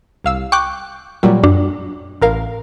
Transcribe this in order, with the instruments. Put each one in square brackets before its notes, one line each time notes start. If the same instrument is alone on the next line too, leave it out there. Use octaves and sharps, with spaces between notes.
[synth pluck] C2 F5 E6
[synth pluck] G5 D6 G6 [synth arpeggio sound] C#6 F#6
[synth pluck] A#2 F#3 G3
[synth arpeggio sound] F#2 D4
[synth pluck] A1 A#4 F5